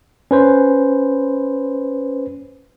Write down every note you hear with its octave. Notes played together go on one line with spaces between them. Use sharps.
C#4 B4 C5